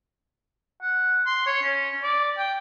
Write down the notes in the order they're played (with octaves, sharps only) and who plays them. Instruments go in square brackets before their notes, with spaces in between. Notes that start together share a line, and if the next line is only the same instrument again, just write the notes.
[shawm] F#5
C6
C#5
C#4
D5
G5